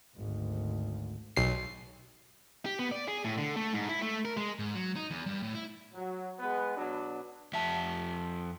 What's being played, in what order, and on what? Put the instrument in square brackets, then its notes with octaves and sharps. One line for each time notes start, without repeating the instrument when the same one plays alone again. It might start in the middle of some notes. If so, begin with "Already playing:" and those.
[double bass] G#1 D2
[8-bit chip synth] B1 C7
[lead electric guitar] G4
B3
D5
G#4
A2
D3
A3
G#2
E4
A3
A#4
G#3
G#2
F#3
D#4
E2
G2
A2
E4
[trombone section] F#3
G#3 B3
B2 F#3 D4
[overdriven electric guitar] F2 E5 [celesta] A5 B6